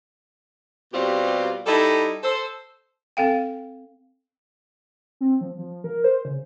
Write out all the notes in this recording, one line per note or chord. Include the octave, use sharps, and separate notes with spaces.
B2 G3 C4 F4 G4
G3 D#4 E4 A4
A4 C5
C4 A4 F5 G5
C4
F3
F3
A#4
C5
C#3